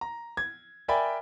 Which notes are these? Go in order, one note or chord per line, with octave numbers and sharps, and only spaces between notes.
A#5
G#6
A#4 D5 E5 G5 G#5 B5